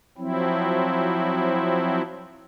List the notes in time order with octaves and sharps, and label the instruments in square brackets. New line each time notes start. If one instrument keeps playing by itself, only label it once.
[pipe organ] F3 F#3 C4 E4